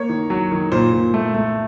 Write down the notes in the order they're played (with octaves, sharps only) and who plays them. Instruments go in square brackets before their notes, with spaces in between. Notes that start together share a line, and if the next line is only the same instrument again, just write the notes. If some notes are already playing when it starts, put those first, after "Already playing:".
Already playing: [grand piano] A#3 C#5
D#3
F#3
D#3
A#2 C5
A#2
A3
A3